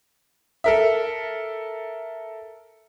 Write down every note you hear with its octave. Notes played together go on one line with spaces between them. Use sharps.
A4 A#4 E5